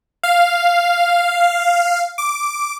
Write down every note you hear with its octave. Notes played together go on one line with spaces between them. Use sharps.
F5
D6